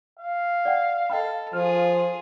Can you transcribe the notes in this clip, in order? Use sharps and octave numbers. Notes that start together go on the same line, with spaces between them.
F5
D5 F#5 G5
A4 D#5 G5 B5
F3 F4 G#4 F6